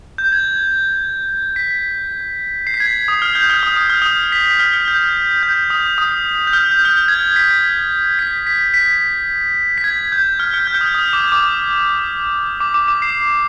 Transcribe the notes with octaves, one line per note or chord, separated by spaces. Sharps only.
G6
G#6
B6
C7
B6
G#6
D#6
F6
G6
F6
D#6
D#6
F6
D#6
B6
B6
F6
F6
G6
G6
D#6
D#6
G6
F6
G6
F6
G6
G#6
B6
B6
B6
B6
B6
G#6
G6
F6
F6
G6
F6
D#6
D#6
D6
D6
D6
D6
D6
C7